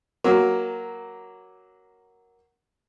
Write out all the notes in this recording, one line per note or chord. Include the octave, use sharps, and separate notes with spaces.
F#3 A#3